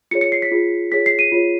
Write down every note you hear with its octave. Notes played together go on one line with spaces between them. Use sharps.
F4 G#4 C#5 C#7
C#7
C7
B6
F4 G#4 C#5
F4 G#4 C#5 B6
C7
D#7
F4 G#4 C#5